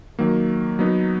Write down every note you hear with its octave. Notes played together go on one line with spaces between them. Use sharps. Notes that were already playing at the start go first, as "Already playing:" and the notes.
D#3 F#3 A#3
F#3 B3 D#4